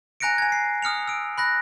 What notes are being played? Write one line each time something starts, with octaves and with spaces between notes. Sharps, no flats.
G#5 A#5 F#6 A#6 C#7 D7
G#5 G#6
C7
D#6 F6 C#7 F7
E6 D7
B5 F#6 A#6